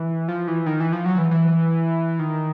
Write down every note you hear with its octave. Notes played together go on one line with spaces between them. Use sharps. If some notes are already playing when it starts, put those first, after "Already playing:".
Already playing: E3
F3
E3
D#3
E3
F3
F#3
E3
E3
D#3